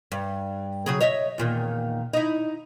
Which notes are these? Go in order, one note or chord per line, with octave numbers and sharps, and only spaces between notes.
G2
C#3 F#3 G#4
C#5 D#5 E5
E2 A#2 D#3
D#4 E4